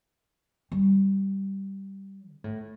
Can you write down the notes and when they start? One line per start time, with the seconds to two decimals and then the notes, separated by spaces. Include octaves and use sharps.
0.72 G3
2.33 C3
2.44 A2